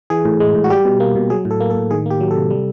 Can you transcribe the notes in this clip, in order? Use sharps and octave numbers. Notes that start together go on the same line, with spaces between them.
E3 G#4
A2
G#3
A2
F#4
G3 G4
B2
A#3
B2
F#3 G#4
A2
A4
A#3
A4
A2
D#3 G#4
A#3 G4
F#3
C3 A4
G3